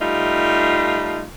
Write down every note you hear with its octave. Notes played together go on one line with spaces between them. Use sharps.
G3 A3 D#4 F4